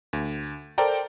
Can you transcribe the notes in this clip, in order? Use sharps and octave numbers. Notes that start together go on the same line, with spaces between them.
D2
A4 A#4 C5 D5 G5 A#5